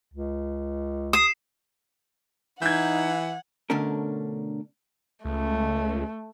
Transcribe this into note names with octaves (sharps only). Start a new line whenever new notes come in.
C#2
D#6 C7 E7
E3 D#4 F#5 G6 G#6
B2 D3 A3 C#4 D4 A#4
C#2 A3